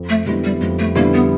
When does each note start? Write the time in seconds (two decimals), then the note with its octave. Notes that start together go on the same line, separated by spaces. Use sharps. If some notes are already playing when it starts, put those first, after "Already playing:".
Already playing: F2
0.09 A3
0.26 D3 G3 G#3 B3 E4
0.44 G3
0.61 F2 G#3
0.79 A3
0.96 D3 G3 A#3 B3 E4
1.14 B3